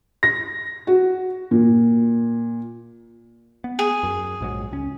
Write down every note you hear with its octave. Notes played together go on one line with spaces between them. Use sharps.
A#6
F#4
A#2
B3
G#4
F#2
A#1 G#2 F#3
C#2 C#4